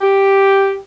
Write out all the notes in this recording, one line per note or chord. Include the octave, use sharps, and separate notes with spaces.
G4